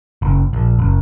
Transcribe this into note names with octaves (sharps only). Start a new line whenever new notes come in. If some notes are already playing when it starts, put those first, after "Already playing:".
F#1
A#1
F#1